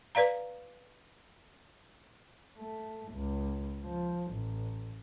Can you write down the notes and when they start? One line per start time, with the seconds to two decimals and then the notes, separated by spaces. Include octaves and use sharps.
0.15 B4 D5 F5 A#5
2.58 A3
3.12 C#2
3.83 F3
4.32 A1